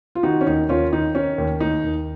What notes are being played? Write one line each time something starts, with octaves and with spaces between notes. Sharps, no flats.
F4
D#3 D#4 F#4
C#4
D#2 D#4
D#2 C#4 F4
D#3 D#4
D#3 C#4
D#2
D#2 D#4
D#2